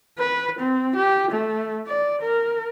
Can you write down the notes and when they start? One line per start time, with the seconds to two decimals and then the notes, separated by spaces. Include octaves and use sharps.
0.18 B4
0.59 C4
0.96 G4
1.31 A3
1.87 D5
2.22 A#4